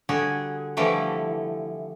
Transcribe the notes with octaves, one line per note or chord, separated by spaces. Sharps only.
D3 G3 F#4 G#4
D3 E3 F3 G3 A3 E4